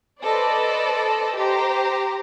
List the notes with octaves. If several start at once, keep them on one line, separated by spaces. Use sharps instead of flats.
A4 B4 C5 D5 D#5
G4 C5 A#5